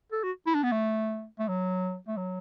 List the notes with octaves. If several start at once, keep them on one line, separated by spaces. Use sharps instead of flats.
A4
F#4
E4
D4
B3
A3
A3
F#3
A3
F#3